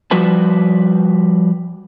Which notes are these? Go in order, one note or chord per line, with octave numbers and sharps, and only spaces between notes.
F3 G3 F#4 B4 A5